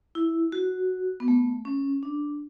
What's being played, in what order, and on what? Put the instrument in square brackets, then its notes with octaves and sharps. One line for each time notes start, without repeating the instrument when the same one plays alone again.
[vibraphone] E4
F#4
B3
A3
C#4
D4